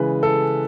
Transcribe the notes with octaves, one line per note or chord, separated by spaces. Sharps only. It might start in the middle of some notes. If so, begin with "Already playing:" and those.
Already playing: C#3 E3 G#3 B4
A4